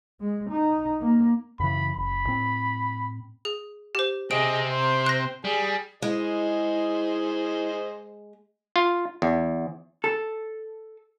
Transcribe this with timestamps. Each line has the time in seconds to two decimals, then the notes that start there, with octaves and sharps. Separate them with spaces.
0.20 G#3
0.50 D#4
1.01 A#3
1.60 F#2 C#3 E3 B5
1.97 F#1 B5
2.27 A2 C4
3.45 G#4
3.95 G4 C5
4.31 C3 C4 G#4 D#5 D7
4.70 C5
5.06 F#6 A#6
5.45 G3 G#4
6.02 G#3 E4 G#4 C5 D#5
8.76 F4
9.22 E2
10.04 A4